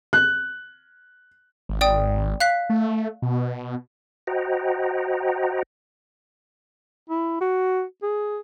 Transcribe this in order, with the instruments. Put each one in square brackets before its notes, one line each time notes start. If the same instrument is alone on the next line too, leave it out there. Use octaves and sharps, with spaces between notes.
[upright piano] F#6
[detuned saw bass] G#1
[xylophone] D5 G5 D#6
F5 F#6 B6
[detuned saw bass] A3
B2
[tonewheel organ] F#4 C5 D#5 F#5 G5 A#5
[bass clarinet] E4
F#4
G#4